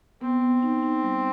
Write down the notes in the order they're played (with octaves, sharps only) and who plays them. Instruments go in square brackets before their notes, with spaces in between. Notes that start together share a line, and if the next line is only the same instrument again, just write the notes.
[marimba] B3 [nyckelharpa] C4
[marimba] B3
D#4
D#4
G3